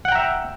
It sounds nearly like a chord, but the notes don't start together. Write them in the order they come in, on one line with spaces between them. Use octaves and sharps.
F#5 G5 A#5 E5